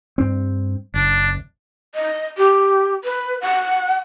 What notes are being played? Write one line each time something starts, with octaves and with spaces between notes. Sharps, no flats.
G2 C4
F#1 D4
D#5
G4
B4
F#5